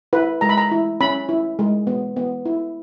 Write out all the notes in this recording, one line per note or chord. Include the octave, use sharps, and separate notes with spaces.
E4 B4
G#3 A#5
B5
A#5
E4
C#4 B5
E4
G#3
B3
B3
E4